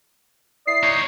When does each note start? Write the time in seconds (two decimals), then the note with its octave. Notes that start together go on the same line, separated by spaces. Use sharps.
0.67 E4 D5 D#6 C7
0.83 D#4 C#5